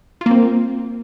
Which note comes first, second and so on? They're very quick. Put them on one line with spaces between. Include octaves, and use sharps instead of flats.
F4 A#3 C4